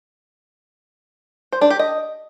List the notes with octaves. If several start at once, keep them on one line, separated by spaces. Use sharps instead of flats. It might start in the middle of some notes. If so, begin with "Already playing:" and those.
C5
D4
G4
D#5